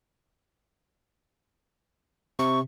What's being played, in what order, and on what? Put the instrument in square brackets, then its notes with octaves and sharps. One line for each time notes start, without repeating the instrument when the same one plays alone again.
[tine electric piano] C3 [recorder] C#6